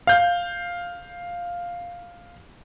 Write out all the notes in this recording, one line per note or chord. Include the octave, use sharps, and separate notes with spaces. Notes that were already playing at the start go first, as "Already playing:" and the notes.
F5 G6